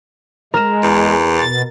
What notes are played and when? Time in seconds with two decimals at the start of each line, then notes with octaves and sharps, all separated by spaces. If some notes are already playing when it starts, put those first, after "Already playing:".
0.54 G#3 A#4 E7
0.83 E2
1.38 B2 A6